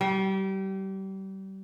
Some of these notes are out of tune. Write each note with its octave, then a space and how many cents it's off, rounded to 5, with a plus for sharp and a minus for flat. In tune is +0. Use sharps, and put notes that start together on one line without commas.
G3 -30